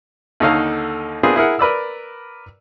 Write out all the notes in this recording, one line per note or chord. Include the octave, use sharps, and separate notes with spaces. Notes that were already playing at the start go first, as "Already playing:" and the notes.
D#2 D3 D#4 A4 C#5 F5
B3 C4 D4 F4 G#4 A#4
E4 G#4 A#4 F#5
A#4 B4 D5 E6